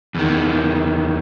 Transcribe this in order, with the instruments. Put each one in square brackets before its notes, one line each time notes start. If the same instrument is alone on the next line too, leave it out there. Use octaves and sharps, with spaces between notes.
[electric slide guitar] E2 D#3